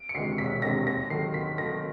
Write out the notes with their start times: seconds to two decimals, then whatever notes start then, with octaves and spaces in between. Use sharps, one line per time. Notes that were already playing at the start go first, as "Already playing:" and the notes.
Already playing: D7
0.09 C#7
0.14 D2 C3 D#3 G#3 C7
0.38 E1 B6
0.62 D2 C3 D#3 G#3 A#6
0.87 D#2 A#6
1.10 D#3 F#3 A3 C7
1.34 D#2 B6
1.58 D#3 F#3 A3 A#6